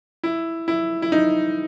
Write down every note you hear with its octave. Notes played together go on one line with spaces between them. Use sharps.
E4
E4
E4
D#4